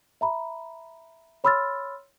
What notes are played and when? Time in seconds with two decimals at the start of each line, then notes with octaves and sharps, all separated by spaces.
0.21 E5 A#5 B5
1.44 C#5 B5 C6 E6 F6 A6